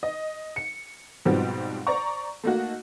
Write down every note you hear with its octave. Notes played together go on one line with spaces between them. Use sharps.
D#5
C#7
G#2 B2 F3 G3 C4
C5 D5 A#5 C#6
A3 A#3 D#4 F#4